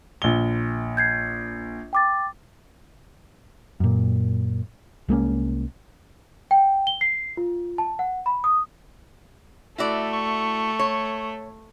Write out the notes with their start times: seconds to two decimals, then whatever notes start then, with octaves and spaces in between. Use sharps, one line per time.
0.22 A#1 G7
0.97 G6 G#6 C7
1.93 G5 D6 A6
3.80 F#2 A#2
5.09 C2 G#3 A#3 C#4
6.51 G5
6.87 G7
7.01 C7
7.37 F4
7.78 A5
7.99 F#5
8.26 B5
8.44 D#6
9.78 A3 E4 F#4 D5
10.13 C#6
10.79 C#5